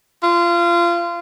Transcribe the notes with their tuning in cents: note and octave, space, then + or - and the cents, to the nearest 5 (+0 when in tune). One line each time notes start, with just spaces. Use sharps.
F4 -25